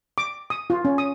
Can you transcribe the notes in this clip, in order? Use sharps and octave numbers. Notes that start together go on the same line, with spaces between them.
D6
D#6
F4
C#4
D#6